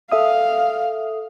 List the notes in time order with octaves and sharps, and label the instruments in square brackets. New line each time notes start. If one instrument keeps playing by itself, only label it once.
[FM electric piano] A4 E5 D#6 [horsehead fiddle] F5